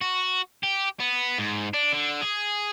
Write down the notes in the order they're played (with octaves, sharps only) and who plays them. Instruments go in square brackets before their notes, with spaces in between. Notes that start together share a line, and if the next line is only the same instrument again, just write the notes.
[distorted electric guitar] F#4
G4
B3
G#2
D4
D3
G#4